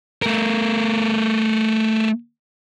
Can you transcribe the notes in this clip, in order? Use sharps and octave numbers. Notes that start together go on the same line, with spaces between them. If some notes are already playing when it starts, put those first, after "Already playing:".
A3 A#4